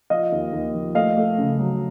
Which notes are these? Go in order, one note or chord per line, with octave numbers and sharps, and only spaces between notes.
F3 D#5 F5
D#2
D#2
F3
A3 D#5 F5
A3
C#3
F#3